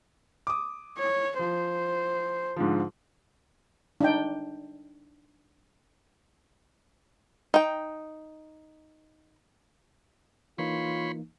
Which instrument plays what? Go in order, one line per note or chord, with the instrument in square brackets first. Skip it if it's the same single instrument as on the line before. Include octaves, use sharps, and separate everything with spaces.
[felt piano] D6 D#6
[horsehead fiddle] C#5
[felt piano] F3 [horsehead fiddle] C5
[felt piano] G#2 D3 F3
[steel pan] D4 D#4 G5
[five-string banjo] D#4 G5
[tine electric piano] E3 A#3 D#4 [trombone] F4 [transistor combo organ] C#5 B5 C6